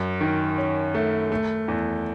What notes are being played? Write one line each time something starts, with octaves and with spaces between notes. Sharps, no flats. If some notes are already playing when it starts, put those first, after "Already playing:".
Already playing: F#2
D#3
C#4
A3
A3
E2